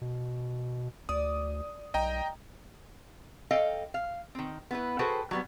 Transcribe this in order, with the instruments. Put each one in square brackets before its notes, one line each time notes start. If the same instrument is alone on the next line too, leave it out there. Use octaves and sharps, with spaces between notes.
[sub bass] B2
[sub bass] D2 [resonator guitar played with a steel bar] D5 [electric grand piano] D#6
[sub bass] B1 [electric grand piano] D#5 G5 A#5
[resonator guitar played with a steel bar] A4 D#5 F5 G5
F5
D#3 C4
B3 E4 B4
F#4 G#4 A4 B4 C5 G5
F#3 G3 B3